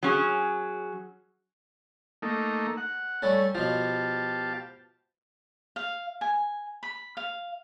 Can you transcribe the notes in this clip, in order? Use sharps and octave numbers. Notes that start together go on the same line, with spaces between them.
F#3 C#4 G#4
A3 A#3 D#4
F#5
G3 A3 C#4 A4
B2 F3 G4 F5 A5
F5
G#5
B5
F5